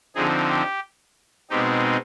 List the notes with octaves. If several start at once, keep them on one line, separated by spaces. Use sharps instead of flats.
D3 F3 C4 D#4 G#4
G4
B2 G#3 C4 D#4 G4